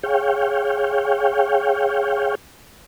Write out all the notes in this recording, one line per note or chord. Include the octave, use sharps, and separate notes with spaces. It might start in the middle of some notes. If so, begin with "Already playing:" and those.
G#4 C#5 F5 G5